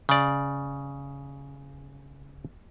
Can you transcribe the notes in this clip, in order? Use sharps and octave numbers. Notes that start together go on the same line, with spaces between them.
C#3 D5